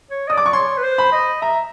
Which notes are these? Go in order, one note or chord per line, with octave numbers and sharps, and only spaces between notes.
C#5
D5 D#5 D#6
D6
C#6
C#5 C6
B4
C5
B5
D#5
E5 A#5